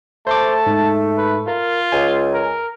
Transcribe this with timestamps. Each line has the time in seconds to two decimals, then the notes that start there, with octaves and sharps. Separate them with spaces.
0.27 A3 C5 A5 C6 D6
0.67 G#2
1.18 B4
1.48 F4 A#4
1.92 C#2 G#5
2.34 A#4